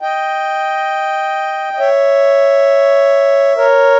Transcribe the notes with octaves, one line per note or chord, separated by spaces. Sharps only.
D#5 G5
D#5
C#5 E5
A#4 C#5